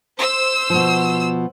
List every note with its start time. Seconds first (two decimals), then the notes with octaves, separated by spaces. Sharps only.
0.18 C5 E6
0.70 B2 F3